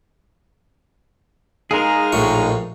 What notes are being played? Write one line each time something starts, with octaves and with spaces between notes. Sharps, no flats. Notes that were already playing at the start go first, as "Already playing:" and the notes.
G#3 D#4 G#4 A#4 F5
A#1 A2 C#6